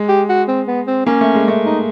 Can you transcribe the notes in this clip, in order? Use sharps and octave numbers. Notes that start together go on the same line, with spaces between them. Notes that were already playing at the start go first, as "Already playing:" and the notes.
Already playing: G#3
G4
F#4
C4
B3
C4
A#3 C#4
A3
G#3
A3
D#4